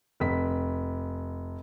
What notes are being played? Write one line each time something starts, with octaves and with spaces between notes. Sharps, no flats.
F1 B6